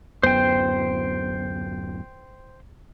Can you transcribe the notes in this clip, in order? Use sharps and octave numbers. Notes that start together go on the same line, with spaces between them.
D1 F#2 B3 C5 G5